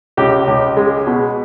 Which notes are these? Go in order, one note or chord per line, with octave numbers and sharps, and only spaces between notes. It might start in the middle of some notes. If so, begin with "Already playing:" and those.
C#2 G4
C#2
G#3
B2